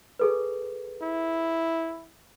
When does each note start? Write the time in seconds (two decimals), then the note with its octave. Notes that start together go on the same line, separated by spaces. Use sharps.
0.19 G#4 A4 B4
1.02 E4